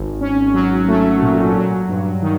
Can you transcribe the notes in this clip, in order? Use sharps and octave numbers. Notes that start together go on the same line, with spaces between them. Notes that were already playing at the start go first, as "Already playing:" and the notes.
Already playing: G#1
C#4
F#3
A3
A#2
F#3
G2
D#3